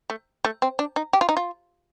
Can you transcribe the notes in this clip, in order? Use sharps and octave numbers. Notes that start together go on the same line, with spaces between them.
A3
A3
C4
D4
D#4
G4
F4
D#4
F4